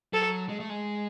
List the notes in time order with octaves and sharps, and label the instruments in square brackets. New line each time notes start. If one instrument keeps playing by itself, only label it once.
[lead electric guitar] F#3 [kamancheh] A4
[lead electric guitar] G#3
A3
G#3